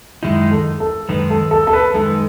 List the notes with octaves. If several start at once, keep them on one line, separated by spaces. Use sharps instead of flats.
F#2 D#3 G#3 D#4 E4
A4
A4
F#2 D#3 G#3 D#4 B4
A4
A4
A4
B4
F#2 D#3 G#3 D#4 A4